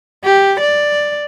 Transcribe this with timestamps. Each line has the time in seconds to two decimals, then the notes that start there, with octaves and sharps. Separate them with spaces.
0.25 G4
0.60 D5